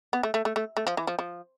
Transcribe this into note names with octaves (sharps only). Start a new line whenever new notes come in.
B3
A3
A3
A3
A3
A3
F3
E3
F3
F3